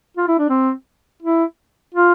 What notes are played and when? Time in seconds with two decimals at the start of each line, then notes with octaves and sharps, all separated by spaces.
0.17 F4
0.28 E4
0.39 D4
0.49 C4
1.22 E4
1.94 F4